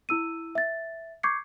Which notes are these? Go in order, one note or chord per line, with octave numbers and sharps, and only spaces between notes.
E4 E6 D#7
E5 A6
C#6 D6 G6 G#6 C7 C#7